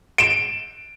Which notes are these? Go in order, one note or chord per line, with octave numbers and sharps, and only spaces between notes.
D7 E7